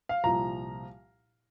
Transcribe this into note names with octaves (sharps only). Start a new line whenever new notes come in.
F5
C2 A#2 F3 A#3 A#5